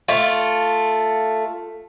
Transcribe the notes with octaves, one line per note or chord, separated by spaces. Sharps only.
A3 F4